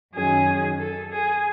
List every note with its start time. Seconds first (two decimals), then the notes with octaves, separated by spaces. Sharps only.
0.13 F#2 D#3 F#3 C#4 G#4
0.79 A4
1.12 G#4